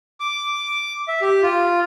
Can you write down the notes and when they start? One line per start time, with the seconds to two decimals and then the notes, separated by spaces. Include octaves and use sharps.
0.20 D6
1.08 E5
1.21 G4
1.42 F4